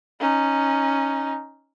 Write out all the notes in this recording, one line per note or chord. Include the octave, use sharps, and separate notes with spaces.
C#4 D#4